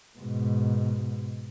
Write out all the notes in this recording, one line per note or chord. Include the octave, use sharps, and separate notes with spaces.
G#2 B2